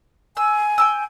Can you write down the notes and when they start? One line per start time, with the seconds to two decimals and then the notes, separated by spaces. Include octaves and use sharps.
0.37 G#5 E6
0.78 G5 A5 E6